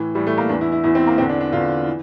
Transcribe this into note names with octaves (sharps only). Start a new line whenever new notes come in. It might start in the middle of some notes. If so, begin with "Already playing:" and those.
Already playing: A2 E3
A2 E3 G3
A3
A#3
E2 E3 D4
E4
E4
E2 E3 E4
C4
A#3
E2 D3 C4
D4
D4
E2 D3 F4
E3